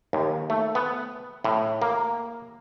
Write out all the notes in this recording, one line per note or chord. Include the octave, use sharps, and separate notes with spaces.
D#2
A3
B3
A2
A#3